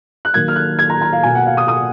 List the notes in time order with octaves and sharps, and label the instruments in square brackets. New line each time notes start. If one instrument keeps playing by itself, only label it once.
[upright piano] F#6
D#3 F#3 A#3 G#6
F6
F#6
G#6
A#5
A#5
F5
B2 A#3 G#5
F#5
F5
D#6
D#6